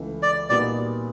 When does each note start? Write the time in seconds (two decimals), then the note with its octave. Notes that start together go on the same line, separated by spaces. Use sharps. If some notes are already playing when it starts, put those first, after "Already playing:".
Already playing: C#2 C#3 E3 A3
0.23 D5
0.50 A#2 G3 B3 D#4 F#4 D5